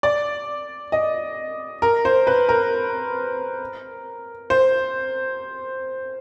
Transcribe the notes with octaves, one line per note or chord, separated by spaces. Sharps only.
D5
D#5
A#4
C5
B4
A#4
C5